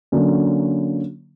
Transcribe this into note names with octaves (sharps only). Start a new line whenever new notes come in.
D3 F#3 A#3 C#4